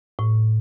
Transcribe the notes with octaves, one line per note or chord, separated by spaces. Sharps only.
A2